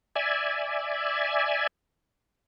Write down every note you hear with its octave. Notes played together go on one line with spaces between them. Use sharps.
D5 E5 G#5